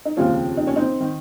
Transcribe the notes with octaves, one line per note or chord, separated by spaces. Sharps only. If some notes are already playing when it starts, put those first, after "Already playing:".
D#4
F1 D#2 C#3 F3 C#4 F4
D#4
C#4
C4 D#4
D#3